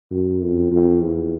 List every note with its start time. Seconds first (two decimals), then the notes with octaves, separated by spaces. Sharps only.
0.11 F#2
0.41 F2
0.71 F2
1.02 E2